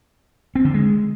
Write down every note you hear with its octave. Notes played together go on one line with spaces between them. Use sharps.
C4
D3
G#3